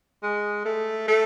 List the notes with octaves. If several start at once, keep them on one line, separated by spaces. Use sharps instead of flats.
G#3
A3
A3